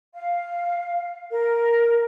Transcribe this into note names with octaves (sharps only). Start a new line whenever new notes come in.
F5
A#4